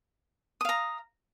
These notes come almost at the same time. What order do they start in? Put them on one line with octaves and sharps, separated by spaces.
D#6 F5 A#5